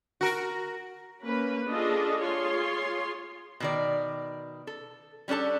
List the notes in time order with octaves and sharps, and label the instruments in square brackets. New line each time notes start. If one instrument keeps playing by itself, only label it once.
[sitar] F#4 A#4
[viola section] A#3 C#4 B4
D4 F4 G#4 A4 D#5
F4 G#4 C#5 C6
[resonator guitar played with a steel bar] B2 D#3 D5
A4
G3 C#4 D4 A4 A5